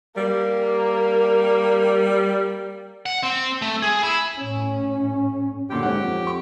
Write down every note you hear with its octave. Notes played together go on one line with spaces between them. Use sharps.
G3 A#3
F#5
C4
A3
G#4
E4
A2 C#4
F#2 A#2 D3 G4 G5
G#2 C#5 F#5
F2
C#6